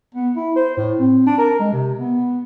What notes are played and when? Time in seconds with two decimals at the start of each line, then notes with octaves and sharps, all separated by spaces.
0.15 B3
0.36 E4
0.56 C5
0.77 A2
1.00 C4
1.27 D4
1.38 A#4
1.59 G#3
1.73 C3
1.99 B3